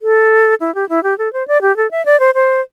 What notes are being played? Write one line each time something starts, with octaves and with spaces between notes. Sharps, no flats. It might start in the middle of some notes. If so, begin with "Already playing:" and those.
A4
E4
G4
E4
G4
A4
C5
D5
G4
A4
E5
D5
C5
C5